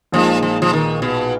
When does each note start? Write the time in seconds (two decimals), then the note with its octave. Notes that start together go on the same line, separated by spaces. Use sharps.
0.12 A#1 A#2 F3 G#3 D#4
0.43 F3
0.62 F3
0.73 D#3
1.02 B2